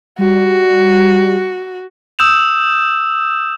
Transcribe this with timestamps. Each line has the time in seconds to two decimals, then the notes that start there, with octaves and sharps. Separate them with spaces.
0.18 G3 F#4
2.19 D#6 E6 G6 E7 F7